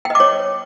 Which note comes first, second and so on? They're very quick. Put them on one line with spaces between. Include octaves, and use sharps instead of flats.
G5 D#5 D6 C#5